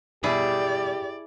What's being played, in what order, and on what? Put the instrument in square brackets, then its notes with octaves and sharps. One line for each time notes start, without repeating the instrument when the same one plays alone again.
[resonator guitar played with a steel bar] B2 G3 [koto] E4 G#4 [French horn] G4 [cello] D5